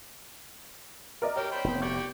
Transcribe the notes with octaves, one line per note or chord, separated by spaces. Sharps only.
A#4 D5 D#5
G4 A#4 C#5
C5 G5 B5
F1 A2 B3
G4 D5 C#6 G6